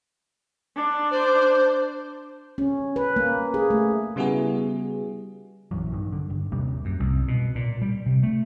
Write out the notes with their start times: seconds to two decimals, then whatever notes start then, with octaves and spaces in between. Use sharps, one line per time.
0.76 D4
1.11 C5
2.58 C#4
2.96 B4
3.16 A#3
3.54 G#4
3.70 A3
4.16 C#3 G3 B3 E4 F#4 G#4
5.71 A#1 F#2 E3 F#3
5.92 G2 D#3
6.12 D3
6.30 G1
6.52 D#2 C3 G3 A#3
6.85 F#2
7.00 C2
7.28 B2
7.55 A#2
7.82 G3
8.06 C3
8.23 A3